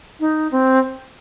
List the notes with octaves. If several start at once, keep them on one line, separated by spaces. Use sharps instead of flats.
D#4
C4